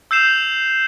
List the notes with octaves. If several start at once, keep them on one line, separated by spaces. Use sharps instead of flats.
E6 G6 C7 E7 F7